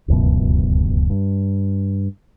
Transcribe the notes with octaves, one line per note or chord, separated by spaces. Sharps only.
D1 C#2 F#2 B2
G2